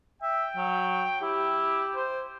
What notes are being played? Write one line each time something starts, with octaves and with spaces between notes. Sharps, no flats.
E5 G5
F#3
E4 G4
C5